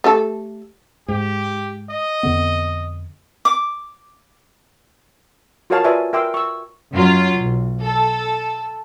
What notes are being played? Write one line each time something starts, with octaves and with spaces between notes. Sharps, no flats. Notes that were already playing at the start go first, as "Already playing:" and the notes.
A3 G4 A4
G#2 G4
D#5
F2 D3 B3
D6
F4 F#4 A#4 C#5 F5 A5
F4 B4 D5 E5 G#5 D#6
A#4 E5 G5 C6 D6 E6
C#6 E6
F#2 F#3 F4
B1
A4